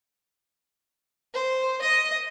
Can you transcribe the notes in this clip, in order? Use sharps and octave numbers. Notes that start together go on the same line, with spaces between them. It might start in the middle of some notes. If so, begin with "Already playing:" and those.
C5
D#5